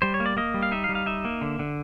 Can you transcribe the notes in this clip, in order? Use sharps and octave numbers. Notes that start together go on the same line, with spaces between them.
G3 C5
C#5
A#3
D5
A#3 D#5
G3
F5
D#4 E5
F5
G3
F5
D#4 E5
A#3
D3
D3